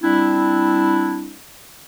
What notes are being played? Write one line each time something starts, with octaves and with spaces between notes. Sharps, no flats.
G3 C4 D4 E4